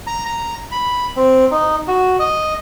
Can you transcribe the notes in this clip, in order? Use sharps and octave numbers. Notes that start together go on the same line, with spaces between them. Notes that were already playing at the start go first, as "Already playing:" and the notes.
A#5
A#5
B5
C4
D#4
F#4
D#5